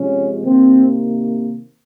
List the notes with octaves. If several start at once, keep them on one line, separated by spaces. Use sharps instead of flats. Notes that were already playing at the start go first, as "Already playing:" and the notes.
Already playing: C3 F3 G#3 C#4
C3 D#3 A#3 C4